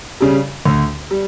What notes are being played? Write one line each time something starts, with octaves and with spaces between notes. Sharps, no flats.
C#3 G3
D2
G3